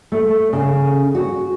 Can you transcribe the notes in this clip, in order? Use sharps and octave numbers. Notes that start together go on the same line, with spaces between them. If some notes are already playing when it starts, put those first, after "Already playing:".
A3
C#3
F#4